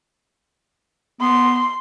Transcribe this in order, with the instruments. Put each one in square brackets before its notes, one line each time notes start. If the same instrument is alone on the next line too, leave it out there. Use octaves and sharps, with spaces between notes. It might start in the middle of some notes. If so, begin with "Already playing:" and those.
[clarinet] B3 [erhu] C6